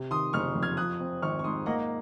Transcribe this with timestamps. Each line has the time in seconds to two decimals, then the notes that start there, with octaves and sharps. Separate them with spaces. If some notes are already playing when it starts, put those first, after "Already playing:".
Already playing: C3
0.11 D#3 C6 D#6
0.33 F#1 C#6 F6
0.55 F2
0.63 F6 G#6
0.77 F3 D#6 F#6
1.00 C4
1.22 G#1 C#6 F6
1.39 C#6
1.44 G#2 C6 D#6
1.66 A#3 D#5 F#5